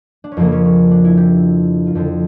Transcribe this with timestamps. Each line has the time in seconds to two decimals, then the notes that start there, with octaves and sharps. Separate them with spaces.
0.24 D4
0.32 C#4
0.37 F2 C#3 F3 A#3
0.52 C#4
0.65 C#4
0.91 D4
1.04 E4
1.17 G4
1.86 F4
1.95 F2 D3 F3 G4